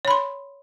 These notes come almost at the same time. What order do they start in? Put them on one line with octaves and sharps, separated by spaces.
C#5 B5 C6